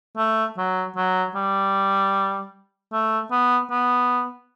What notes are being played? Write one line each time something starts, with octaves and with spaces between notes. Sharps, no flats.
A3
F#3
F#3
G3
A3
B3
B3